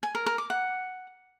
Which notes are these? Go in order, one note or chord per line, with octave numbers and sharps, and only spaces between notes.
G#5
A#4
A#4
D6
F#5